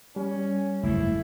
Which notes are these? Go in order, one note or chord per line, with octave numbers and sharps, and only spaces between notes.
G3 C#4
F#1 E2 G#2 A3 E4